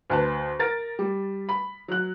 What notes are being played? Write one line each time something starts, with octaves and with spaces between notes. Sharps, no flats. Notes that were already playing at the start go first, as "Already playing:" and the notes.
D2 B4 A5
A#4 A6 D7
G3
B5
F#3 F#6